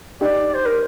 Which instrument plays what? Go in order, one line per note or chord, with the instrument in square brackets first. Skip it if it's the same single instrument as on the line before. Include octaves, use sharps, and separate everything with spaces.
[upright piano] D#4 G4 [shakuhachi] D5
[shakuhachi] C5
A#4